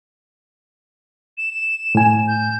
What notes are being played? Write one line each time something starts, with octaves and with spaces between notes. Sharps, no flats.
E7
A2 G#5
G6